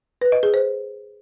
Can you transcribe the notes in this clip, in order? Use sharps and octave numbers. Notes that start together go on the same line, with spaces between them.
B4
D#5
G#4
C5